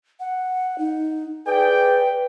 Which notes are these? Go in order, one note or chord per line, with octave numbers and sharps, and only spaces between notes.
F#5
D#4
G#4 B4 D5 G5